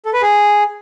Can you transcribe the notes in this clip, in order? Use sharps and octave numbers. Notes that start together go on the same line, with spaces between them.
A4
B4
G#4